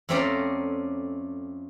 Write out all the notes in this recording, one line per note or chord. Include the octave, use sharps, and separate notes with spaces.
F2 A3 C4 C#4 D5 A#5